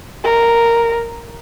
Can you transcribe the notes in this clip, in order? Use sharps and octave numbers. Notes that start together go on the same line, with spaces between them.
A#4